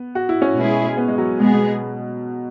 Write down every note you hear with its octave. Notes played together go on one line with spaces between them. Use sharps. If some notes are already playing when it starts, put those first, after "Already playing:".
Already playing: B3
F#4
E4
C#4
B2 G#3 E4 G#4
B3
G#3
F#3
B2 G#3 B3 G#4
B2